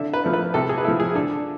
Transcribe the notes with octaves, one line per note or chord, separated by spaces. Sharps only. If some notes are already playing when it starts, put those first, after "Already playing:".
Already playing: D3 E5
B4
F3 A3
B4
C3 A4
G#4
B4
F3 A3 E4 A4
G#4
D3 A4